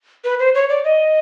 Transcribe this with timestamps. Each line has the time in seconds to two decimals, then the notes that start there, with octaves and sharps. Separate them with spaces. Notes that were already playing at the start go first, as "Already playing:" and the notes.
0.24 B4
0.39 C5
0.55 C#5
0.69 D5
0.85 D#5